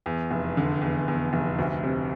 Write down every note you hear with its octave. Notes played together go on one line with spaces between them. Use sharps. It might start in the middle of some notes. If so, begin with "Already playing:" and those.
E2
F1
D3
E2
E2
F1
D2
C3